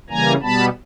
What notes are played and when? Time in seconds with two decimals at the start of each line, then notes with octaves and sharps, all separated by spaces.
0.10 C#3 E3 G3 A#3 G#5 A#5
0.42 B2 G3 B3 A5 B5